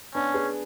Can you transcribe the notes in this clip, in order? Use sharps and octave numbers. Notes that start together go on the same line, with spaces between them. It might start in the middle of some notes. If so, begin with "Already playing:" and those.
B3 C#4 D4
G#4 B4